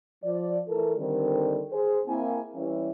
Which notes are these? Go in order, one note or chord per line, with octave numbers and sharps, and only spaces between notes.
F3 D5
E3 A3 A4 A#4
D3 D#3 G3 C4
G#4 C5
A#3 C4 E4 G#5
E3 G3 C#4 E4